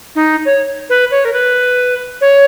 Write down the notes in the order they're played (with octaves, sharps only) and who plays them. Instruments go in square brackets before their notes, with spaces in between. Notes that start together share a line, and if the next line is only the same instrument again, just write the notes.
[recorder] D#4
C#5
B4
C#5
A#4
B4
C#5